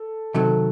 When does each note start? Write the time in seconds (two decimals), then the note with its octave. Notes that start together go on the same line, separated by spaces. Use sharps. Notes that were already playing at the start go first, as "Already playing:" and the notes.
Already playing: A4
0.34 C3 D#3 F#3 A4